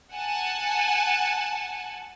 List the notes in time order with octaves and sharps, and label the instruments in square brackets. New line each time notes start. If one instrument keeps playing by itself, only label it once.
[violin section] F#5 G#5 A5